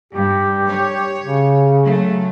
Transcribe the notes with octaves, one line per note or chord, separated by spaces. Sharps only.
G2 G4
C#5
C#3
F#3 A3